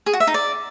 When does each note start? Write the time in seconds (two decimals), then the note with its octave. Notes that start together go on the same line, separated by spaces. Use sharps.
0.06 G#4
0.13 F#4
0.20 E5
0.27 D#4
0.34 D5